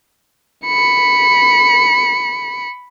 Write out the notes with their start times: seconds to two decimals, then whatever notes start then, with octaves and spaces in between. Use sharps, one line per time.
0.65 B5 C#7